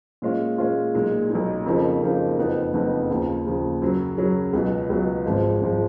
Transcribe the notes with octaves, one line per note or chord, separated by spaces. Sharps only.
A#2 G#3 C#4 F4
A#2 G#3 C#4 F4
B1 A#2 G#3 D#4
B1 A#2 G#3 D#4
F2 C#3 F3 A#3 D#4
F2 C#3 F3 A#3 D#4
F#1 F2 F3 B3 D#4
F#1 F2 F3 B3 D#4
D#2 C#3 F3
D#2 C#3 F3
F#2 C#3 F#3 C#4
F#2 C#3 F#3 C#4
C#2 B2 F#3 B3
C#2 B2 F#3 B3
G#1 G#2 F3 G#3
G#1 G#2 F3 G#3